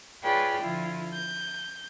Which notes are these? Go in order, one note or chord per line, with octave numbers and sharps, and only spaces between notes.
F4 G#4 B4 C#5 D5 G5
D3 F3 E4 F4
G6